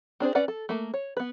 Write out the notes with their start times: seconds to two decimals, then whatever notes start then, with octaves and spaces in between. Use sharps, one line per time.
0.20 C4 D4 G#4 C5
0.35 C#4 B4 D5 F#5
0.48 A4
0.69 A3 A#3
0.94 C#5
1.17 B3 B4